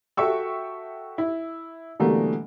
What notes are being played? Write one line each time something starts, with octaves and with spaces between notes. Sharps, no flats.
F#4 A4 E5 G5 C#6 E6
E4
B2 D3 E3 G3 A3 A#3